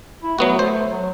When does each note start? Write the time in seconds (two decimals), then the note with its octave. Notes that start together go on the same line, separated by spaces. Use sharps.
0.23 E4
0.39 F#3 A3 B3 F#4
0.59 A3 C5
0.90 F#3